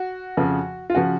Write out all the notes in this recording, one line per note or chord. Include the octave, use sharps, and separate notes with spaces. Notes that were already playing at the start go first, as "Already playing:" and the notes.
Already playing: F#4
F2 C#3 F3
F4
C#3 F3 F#4